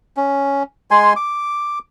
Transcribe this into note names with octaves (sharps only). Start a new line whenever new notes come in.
C#4
G#3 G#5 C6
D6